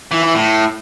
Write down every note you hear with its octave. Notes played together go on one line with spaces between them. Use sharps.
E3
E3
A2